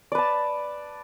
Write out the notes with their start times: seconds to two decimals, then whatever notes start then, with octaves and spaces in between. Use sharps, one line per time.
0.12 D5
0.15 B4
0.18 A5